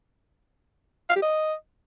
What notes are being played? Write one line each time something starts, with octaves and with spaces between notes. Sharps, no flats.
F5
G4
D#5